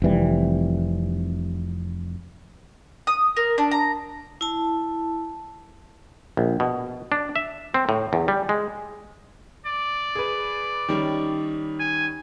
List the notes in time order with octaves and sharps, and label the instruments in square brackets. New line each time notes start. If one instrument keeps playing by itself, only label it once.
[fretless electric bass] F1 C3 E3 G3
[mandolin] D#6
A#4
D4
A#5
[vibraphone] E4 A5
[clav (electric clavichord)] A#1
B2
D4
E5
C4
A2
E2
G3
G#3
[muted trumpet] D5
[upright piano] G#4 B4
D#3 G3 C#4
[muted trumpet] G#5